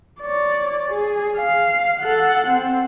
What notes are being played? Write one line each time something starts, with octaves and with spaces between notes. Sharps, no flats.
C#5 D5
G#4
F5
A4 F#5
C4